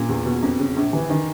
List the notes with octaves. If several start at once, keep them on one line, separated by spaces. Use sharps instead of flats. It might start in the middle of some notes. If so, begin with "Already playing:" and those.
Already playing: A#2
E2
B2
F2
C#3
A#1
E3
D#3